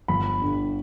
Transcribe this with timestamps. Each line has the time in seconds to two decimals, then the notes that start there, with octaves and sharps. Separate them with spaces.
0.08 G1 B5
0.41 G2 D3